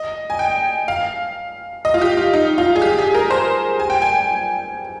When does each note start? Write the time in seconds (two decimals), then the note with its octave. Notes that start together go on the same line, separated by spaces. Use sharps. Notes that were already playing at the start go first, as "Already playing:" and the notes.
Already playing: D#5
0.30 G#5
0.39 G5
0.88 F5
1.85 D#5
1.94 F4
2.01 G4
2.17 F4
2.33 D#4
2.58 F4
2.76 G#4
2.82 G4
2.99 G#4
3.15 A#4
3.30 C5
3.80 G#5
3.90 G5
4.02 G#5